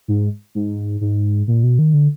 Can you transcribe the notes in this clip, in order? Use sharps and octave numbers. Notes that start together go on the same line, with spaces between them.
G#2
G#2
G#2
A#2
B2
D#3
D3